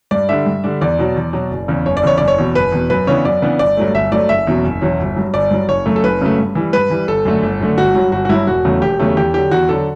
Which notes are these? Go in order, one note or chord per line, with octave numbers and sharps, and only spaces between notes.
G2 D5
D3 G3 D4 E5
G2
D3 G3 D4
E2 D5
B2 F#3
E2
B2 F#3
F#1
E2 C#3
F#1 C#5
D5
E2 C#3 C#5
F#1 D5
C#5
E2 B2
F#1 B4
E2 B2
F#2 B4
C#3 E3 B3 D4 C#5
F#2 D5
C#3 E3 B3 D4
G1 D5
G2 F#3 A3
G1 E5
G2 F#3 A3 D5
F#1 E5
E2 B2 F#3 C#4
F#1
E2 B2 F#3 C#4
G1
G2 F#3
G1 D5
G2 F#3
F#1 C#5
F#2 C#3 F#3 A3
A4
F#1 B4
F#2 C#3 F#3 A3
G2
E3 G3
G2 B4
E3 G3
G1 A4
F#2 D3 A3
G1
F#2 D3 A3
G1 F#4
G2 F#3
G1 F#4
F#4
G2 F#3 E4
E1 F#4
E2 C#3 F#3 A3
E1 G4
E2 C#3 F#3 A3
E2 G4
D3 F#3 G4
E2 F#4
D3 F#3 A4